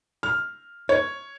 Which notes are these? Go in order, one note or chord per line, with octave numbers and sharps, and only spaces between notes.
F6
C#5